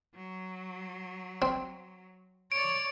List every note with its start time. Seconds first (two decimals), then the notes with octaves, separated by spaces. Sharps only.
0.16 F#3
1.42 C4
2.52 C#5 D5 D7